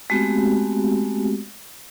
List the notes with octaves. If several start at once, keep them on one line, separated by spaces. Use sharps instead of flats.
G#3 A3 B3 C4 F#4 G4